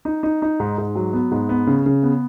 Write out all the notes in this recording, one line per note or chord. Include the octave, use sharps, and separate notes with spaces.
D#4
D#4
D#4
G#2
G#2
F#3
B3
G#2
B3
C#3
C#3
B3